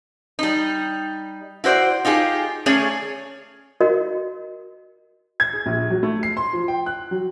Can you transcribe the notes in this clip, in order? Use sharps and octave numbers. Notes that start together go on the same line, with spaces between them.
G3 D#4
E4 F#4 C5 D5
D#4 F4 G4 G#4
A3 C#4 G#4 C#5 D5
F#4 A#4 D#5
G#6
G#4
A#1
F#3
A3
C7
C6
F3
G5
F#6
F#3